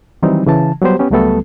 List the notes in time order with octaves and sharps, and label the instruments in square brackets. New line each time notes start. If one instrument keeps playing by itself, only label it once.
[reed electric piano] D#3 E3 F#3 G3 C4 D#4
C#3 E3 A5
F#3 G3 B3 G4 C5
B3 C#4 G4
C#2 F#3 G3 A3 B3 A4